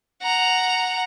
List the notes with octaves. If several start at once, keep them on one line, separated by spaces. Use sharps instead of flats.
F#5 A#5